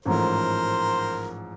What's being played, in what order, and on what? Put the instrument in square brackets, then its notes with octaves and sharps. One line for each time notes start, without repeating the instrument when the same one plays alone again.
[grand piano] A1 G#2 F3 A3 [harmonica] A#4 C5